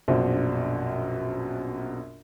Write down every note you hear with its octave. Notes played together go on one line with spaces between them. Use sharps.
A#1 F#2 B2 D4 C5